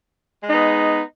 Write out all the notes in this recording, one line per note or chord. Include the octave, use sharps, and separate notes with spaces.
G#3 B3 D#4